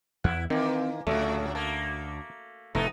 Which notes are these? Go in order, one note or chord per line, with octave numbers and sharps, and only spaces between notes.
E2 E4 F#5
D#3 E3 A#3 C4
D2 A2 C#3 F#3 A3
A3 A#3 A5
F1 A2 A3 B3 D#4 A#5